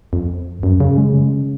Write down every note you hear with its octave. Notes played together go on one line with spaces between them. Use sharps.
F2
F#2
C#3
G#3
C#3